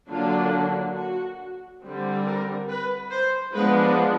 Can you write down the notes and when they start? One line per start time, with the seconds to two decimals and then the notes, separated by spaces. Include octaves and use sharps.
0.10 D3 F#3 A#3 D4 F4
0.96 F#4
1.82 D3 G3 C4
2.26 A#4
2.69 B4
3.11 C5
3.55 F3 G#3 B3 D4 B4